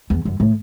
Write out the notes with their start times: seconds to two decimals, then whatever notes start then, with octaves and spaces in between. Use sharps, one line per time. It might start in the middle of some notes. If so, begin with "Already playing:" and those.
0.10 E2
0.25 F#2
0.40 A2